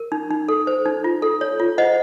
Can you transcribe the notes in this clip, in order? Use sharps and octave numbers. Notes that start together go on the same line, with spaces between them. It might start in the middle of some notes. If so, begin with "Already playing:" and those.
Already playing: A#4
D#4
D#4
A4
C5
D#4
F4
A4
C#5
F4
C5 D#5 F#5